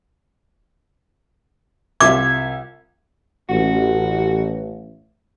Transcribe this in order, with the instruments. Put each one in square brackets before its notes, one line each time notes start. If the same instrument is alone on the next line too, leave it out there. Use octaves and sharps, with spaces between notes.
[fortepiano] C2 F4 E5 [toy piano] D6 [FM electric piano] G#6
[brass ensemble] A1 [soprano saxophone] F#4